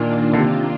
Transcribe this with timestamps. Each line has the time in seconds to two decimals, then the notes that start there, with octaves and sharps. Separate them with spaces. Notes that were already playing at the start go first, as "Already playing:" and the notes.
Already playing: A#2 D#3 A#3 D4 F4
0.33 D3
0.38 C3